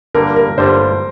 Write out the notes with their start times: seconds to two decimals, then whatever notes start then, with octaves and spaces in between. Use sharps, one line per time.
0.15 G1 G2 D3 G3 A#3 A#4
0.36 A#4
0.58 G1 G2 D3 G3 A#3 C5